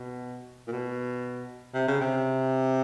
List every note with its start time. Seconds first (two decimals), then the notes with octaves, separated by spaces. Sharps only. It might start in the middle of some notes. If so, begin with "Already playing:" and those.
Already playing: B2
0.67 A#2
0.72 B2
1.74 C3
1.88 C#3
2.01 C3